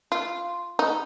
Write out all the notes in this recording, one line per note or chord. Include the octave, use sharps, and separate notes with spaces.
F4
D#4